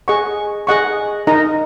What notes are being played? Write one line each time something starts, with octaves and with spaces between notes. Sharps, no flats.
G#4 D#5 F#5 C#6
G#4 D#5 F#5 C#6
D#4 A#4 D#5 A#5